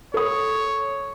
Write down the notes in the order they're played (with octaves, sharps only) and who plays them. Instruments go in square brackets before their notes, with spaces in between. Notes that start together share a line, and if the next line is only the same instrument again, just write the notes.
[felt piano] A4 D#6 [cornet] C#5